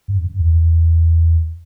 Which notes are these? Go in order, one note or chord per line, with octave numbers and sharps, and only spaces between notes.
G2
F2
F#2
E2